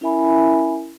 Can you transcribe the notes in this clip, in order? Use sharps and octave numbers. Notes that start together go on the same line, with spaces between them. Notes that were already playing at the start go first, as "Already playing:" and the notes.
C#4 E4 A#4 E5 G#5 B5